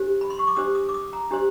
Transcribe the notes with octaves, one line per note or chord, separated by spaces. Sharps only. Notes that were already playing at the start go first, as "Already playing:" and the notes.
Already playing: D4 G4 C5
B5
C6
C#6
D6
D4 G4 C5 D#6
D#6
D6
D#6
A#5
D4 G4 C5